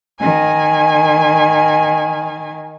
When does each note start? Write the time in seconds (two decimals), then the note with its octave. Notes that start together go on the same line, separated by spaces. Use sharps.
0.19 D#3 G#5